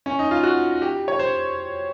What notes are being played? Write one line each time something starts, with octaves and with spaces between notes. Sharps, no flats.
C#4
D#4
F4
F#4
G4
C#5
C5